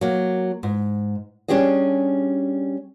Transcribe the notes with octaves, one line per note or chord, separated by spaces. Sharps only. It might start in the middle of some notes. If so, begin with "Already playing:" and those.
F#3 A#3
G#2
G3 C#4 D4 G4 G#4 D#5